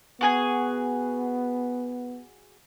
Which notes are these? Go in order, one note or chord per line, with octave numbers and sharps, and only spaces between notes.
B3 F#4 G#4 G#5